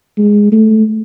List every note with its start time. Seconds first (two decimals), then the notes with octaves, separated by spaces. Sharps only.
0.18 G#3
0.52 A3